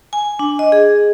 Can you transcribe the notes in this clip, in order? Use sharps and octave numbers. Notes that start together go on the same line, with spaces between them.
G#5
D4
D#5
G#4